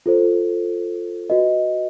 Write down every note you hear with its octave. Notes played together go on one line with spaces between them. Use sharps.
F4 A4 C5
F#4 B4 D#5